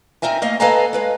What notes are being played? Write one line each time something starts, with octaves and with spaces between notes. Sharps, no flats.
C4 D#4 A#4 E5 G#5
A3 A#3 D#5 F5
A4 B4 D#5 F5 G#5 A#5
G#3 B4 F5